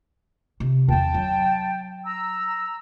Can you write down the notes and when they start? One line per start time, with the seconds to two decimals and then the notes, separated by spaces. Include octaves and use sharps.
0.60 C3
0.88 E2 C4 G5 A5
1.14 F#3
2.04 A#5 E6